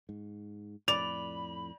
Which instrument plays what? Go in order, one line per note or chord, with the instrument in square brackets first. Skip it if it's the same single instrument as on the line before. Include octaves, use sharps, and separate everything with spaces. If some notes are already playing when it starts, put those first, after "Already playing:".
[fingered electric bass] G#2
[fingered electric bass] F2 A2 [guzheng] D5 [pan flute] B5 [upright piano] F7